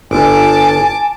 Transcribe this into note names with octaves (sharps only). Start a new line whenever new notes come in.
G1 G#5 A5 D6